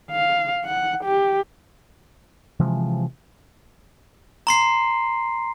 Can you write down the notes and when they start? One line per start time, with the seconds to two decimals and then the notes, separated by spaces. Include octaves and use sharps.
0.11 F5
0.65 F#5
1.04 G4
2.60 C3 E3 F3 G#3
4.47 A#5 C6 C7